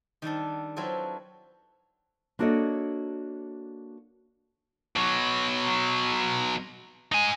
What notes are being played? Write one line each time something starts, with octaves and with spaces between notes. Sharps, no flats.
D#3 G3 D4 A4
F#3 C4 E4 F4 A4 B4
A#3 D4 F#4 A4 C#5 D#5
B2 F#3
D#4 G#5